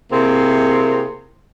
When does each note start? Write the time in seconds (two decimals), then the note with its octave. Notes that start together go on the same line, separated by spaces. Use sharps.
0.11 C3 A#3 C4 E4 G#4